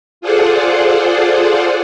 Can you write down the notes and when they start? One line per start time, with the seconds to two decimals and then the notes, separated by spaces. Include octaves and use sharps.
0.21 F4 G#4 A4 C5 D5 F#5